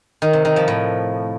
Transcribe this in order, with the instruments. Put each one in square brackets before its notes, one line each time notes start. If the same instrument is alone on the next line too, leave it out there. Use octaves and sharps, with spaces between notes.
[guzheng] D#3
C3
D#3
F3
A2